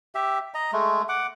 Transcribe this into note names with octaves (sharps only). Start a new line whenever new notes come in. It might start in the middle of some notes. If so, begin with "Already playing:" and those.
G4 E5
D#5 A#5
G#3 A3
F#5 D6